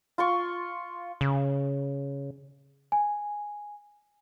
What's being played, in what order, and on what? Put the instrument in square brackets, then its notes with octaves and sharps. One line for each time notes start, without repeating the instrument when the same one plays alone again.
[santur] F4 C6 C#6
[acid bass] C#3
[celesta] G#5